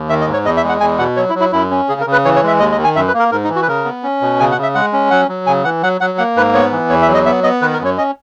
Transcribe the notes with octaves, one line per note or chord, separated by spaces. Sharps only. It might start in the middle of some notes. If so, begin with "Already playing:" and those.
Already playing: D#2
D#3 E5
D#5
G#2
C#5
E2 D#5
E5
G#3
F#5
E2 G#5
B2 F#5
F#3 C#5
E4
F#3
E4
F#2 E4
C#4
C#3 G#4
A#4
C#3
B4
E3 C#5
C#5
G#3 E5
D#2 D#5
D#5
D#3
G#5
F#2 E5
B4
A#3
A#4
G#2 A#4
D#4
E3
F#4
B4
C#3 A#4
B3
C#4
B2
C#3 G#5
F#5
C#3
E5
G#3 F#5
C#4
F#3 F#5
F#3
C#3 G#5
E3 F#5
F#3 F#5
F#3 F#5
A#3 F#5
G#2 B4
B3 C#5
E3
E2 C#5
E5
F#3
D#5
B3 E5
B3 D#5
D#3 B4
A#4
F#2
C#5
C#4 D#5